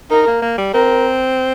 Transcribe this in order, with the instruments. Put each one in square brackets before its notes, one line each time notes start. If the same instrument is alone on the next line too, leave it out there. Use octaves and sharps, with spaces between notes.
[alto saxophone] D#4 [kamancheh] A#4
[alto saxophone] A#3
A#3
G3
[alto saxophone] C4 [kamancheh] A#4